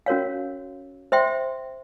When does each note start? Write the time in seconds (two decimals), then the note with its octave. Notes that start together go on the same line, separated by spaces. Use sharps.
0.06 C#4 F#4 A#4 C#5 F5
1.12 C5 E5 G5 C6